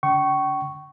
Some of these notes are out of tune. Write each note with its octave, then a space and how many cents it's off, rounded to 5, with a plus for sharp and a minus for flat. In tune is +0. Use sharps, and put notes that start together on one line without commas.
D3 -40 G5 -35 C#6 +0